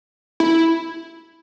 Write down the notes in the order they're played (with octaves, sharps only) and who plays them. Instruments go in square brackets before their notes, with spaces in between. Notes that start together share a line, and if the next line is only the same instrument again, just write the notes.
[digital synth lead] E4